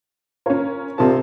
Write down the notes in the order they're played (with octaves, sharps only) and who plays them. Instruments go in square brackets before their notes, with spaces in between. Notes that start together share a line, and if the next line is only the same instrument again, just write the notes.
[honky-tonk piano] C#4 A#4 [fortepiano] F4 C#5
[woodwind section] C2 F3 [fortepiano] C3 A5